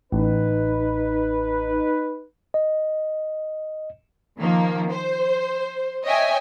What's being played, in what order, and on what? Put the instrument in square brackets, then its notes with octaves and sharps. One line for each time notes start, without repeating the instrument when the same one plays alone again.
[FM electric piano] A1 [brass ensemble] D#4 B4
[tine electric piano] D#5
[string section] D#3 F3 A#3
C5
C#5 D#5 E5 G5 G#5